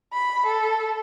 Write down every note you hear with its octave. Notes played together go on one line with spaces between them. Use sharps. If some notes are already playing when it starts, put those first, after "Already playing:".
B5
A4